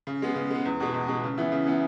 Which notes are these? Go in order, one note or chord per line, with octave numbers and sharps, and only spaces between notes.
C#3
G#3 B3
C#3
G#3 B3
E2
B2 G#3
E2
B2 G#3
C#3
E3 B3 E4
C#3
E3 B3 E4